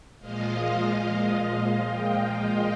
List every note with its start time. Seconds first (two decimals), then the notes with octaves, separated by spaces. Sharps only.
0.20 A#2 F3 G#3 D#5 F5
1.85 F5 G5
2.26 F5 G5